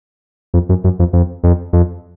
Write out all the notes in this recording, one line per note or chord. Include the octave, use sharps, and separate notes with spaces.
F2
F#2
F#2
F2
F2
F2
F2